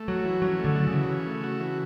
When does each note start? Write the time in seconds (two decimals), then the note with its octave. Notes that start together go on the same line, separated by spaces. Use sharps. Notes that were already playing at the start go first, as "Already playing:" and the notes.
Already playing: A3
0.08 F#3 F#4
0.25 E3
0.42 F#3 C#4
0.59 A3
0.65 D3
0.76 F#4
0.87 C#3
0.93 E3
1.10 C#4
1.27 A3
1.44 F#4
1.60 E3